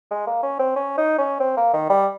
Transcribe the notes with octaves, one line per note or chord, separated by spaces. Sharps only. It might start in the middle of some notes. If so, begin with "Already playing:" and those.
G#3
A#3
C#4
C4
C#4
D#4
C#4
C4
A#3
D#3
G3